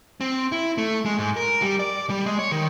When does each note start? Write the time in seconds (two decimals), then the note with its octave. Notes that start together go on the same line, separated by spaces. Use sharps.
0.21 C4
0.52 E4
0.78 A3
1.05 G#3
1.19 G#2
1.37 A#4
1.62 G3
1.80 D5
2.10 G3
2.26 G#3
2.39 C#5
2.52 D#3